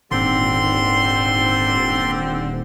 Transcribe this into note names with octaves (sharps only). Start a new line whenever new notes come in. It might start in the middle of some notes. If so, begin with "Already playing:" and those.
D#1 G#2 D3 G3 C4 C6